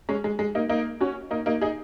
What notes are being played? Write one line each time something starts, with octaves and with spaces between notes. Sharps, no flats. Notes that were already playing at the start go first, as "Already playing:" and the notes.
G#3 C#4
G#3
G#3
A#3 D#4
A#3 D#4
C#4 F#4
A#3 D#4
A#3 D#4
D#4 G#4